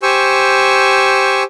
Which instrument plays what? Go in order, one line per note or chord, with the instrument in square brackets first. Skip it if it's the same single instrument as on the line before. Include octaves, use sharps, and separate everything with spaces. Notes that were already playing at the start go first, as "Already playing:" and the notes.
[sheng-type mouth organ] G4 C5 G#5 C#6 E6